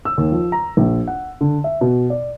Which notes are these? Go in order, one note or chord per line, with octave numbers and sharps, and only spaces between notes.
E6
D#2
F3
A#5
A#1
F#5
D3
E5
B2
D5